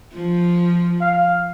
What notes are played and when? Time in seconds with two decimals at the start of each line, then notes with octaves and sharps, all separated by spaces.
0.13 F3
1.01 F5